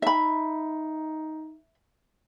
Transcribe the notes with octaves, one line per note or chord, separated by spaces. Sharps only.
D#4 E5 B5